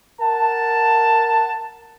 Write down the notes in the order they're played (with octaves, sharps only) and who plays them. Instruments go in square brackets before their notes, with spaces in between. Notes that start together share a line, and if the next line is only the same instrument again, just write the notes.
[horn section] A#4 F#5 A5